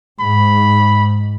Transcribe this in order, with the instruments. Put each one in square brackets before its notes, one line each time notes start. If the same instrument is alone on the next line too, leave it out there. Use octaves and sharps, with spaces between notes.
[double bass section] G#2 [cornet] B5